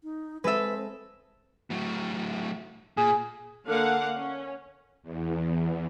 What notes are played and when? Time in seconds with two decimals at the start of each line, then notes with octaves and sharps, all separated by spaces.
0.03 D#4
0.44 G#3 C4 A4 B4 E5
1.70 A2 F#3
2.97 A#2 G#4
3.66 D3 A#3 F5 F#5
4.16 C#4
5.03 E2